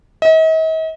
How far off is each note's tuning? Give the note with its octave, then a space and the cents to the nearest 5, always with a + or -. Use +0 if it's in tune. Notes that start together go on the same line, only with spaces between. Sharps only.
D#5 +45